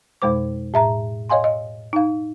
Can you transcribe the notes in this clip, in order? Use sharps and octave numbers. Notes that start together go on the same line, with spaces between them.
F2 B2 G#3 C5 D6
A2 E5 A#5
C#5 D#5 F5 G#5 C6
D#5
D#4 F5